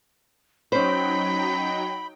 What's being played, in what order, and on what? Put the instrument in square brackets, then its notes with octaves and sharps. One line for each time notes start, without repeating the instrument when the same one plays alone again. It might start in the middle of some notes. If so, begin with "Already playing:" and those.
[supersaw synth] F#3 D#4 G5 [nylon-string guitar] C#4 C5 [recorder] B5